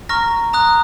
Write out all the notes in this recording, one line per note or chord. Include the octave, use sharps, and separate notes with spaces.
A#5 C#6 F6 A#6
A#5 D#6 F#6